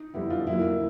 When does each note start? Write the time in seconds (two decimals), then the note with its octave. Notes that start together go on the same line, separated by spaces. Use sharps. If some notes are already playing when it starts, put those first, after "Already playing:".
Already playing: D#4
0.14 F2 D3 G3 B3 E4
0.30 F4
0.47 F2 D3 F#3 A#3 E4